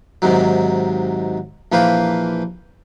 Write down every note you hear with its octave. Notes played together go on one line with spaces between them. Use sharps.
G#2 C3 D#3 F#3
A#1 E3 A#3 B4 C5 F5